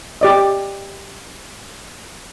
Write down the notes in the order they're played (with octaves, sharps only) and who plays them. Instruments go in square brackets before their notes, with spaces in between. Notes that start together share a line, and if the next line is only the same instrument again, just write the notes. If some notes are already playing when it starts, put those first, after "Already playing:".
[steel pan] G4 D5 D#5